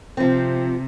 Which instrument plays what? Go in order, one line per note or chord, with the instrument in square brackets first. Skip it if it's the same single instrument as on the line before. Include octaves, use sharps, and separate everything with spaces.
[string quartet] C3 [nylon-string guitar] F3 C4